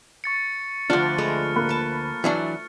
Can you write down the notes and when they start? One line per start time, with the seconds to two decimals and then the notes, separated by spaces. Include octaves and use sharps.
0.24 C#6 A6 C#7
0.90 D2 F3 D4 F#5 D6 F6
1.18 G#3 A3 B4
1.56 A#3 B5 F#6
1.69 B4 A5
2.24 E3 F#3 D4 E5